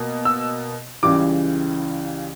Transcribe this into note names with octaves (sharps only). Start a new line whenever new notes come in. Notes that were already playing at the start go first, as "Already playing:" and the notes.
Already playing: B2 A#3
E6
C#2 C#3 E3 G3 D6